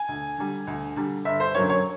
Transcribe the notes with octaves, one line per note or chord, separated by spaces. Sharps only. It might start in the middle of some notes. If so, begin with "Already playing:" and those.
Already playing: G#5
D2
D3 G3
D2
D3 G3
G1 E5
C5
F#2 D3 F#3 A#3 C#5
C#5